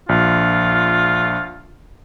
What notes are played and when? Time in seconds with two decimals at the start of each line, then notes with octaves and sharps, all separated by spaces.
0.09 A#1 F4